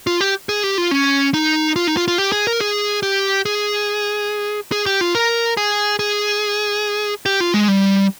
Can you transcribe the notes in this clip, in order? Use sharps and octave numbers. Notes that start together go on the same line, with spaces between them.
F4
G4
G#4
G4
F4
C#4
D#4
F4
D#4
F4
F4
G4
G#4
A#4
G#4
G4
G#4
G#4
G4
F4
A#4
G#4
G#4
G4
F4
G#3
G3